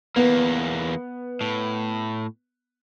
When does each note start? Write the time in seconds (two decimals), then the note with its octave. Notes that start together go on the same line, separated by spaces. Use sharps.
0.16 E2 A#3 B3
1.41 A2